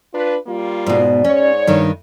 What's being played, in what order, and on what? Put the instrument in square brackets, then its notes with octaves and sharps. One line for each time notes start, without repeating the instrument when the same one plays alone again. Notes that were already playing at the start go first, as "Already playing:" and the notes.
[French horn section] D4 F4 B4
G3 A#3 F4
[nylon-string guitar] G#2 B2 [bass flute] D5
[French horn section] G#2 C#5 [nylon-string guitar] C#4
[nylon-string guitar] G2 D#3 D#4